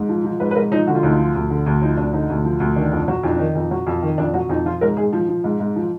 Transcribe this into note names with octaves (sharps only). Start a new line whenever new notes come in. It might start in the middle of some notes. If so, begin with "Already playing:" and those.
Already playing: G#2
F3
F3
G#2 B4
B4
G#2 A#4
F3 D#4
D3 F#4
F4
D2 D#4
F4
F3
D2
D3
D2
F3 D#4
D2 D4
D3 D#4
D2
F3
D2
D#3 D4
F2 D4
F#3
F2 D#4
D4
D#3 D#4
F2
F#3
F2
D#3
F2 D4
F#3 F#4
F2 D#4
F3 F4
G#2 A#4
G#2 G#4
F3
F3
G#2
G#2
F3